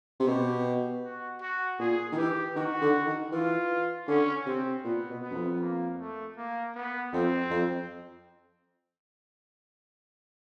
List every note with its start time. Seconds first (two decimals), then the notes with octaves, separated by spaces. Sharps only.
0.20 C3
0.27 B2 G4
1.03 F#4
1.41 F#4
1.79 A#2 G#4
2.12 D#3
2.17 E3 G4
2.56 D#3 F#4
2.81 D3
3.06 D#3
3.32 E3 F4
4.07 D3 C#4
4.45 C3 C4
4.84 A#2 B3
5.10 B2
5.23 B3
5.30 F#2
5.34 F2
5.60 A#3
5.99 A3
6.37 A#3
6.75 B3
7.12 F2 C4
7.50 F2